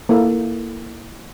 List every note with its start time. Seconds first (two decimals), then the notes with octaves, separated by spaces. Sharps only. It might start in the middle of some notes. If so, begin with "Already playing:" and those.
0.09 A#3 E4 A4